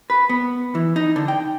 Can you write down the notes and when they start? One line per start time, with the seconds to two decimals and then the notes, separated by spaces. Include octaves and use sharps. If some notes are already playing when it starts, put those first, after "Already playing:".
0.10 B4
0.29 B3
0.75 E3
0.96 D#4
1.16 D3
1.28 G5